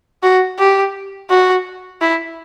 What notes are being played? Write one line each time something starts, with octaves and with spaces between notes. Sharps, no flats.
F#4
G4
F#4
E4